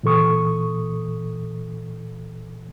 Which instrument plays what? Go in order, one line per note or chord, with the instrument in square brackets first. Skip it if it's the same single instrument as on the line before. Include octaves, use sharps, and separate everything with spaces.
[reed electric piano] A#2 E3 A4 C#6 D#6